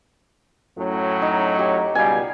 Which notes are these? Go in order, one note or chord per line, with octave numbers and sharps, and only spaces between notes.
F#2 A2 F#3
D#4
G4
C#2 B2 G3 F5 G#5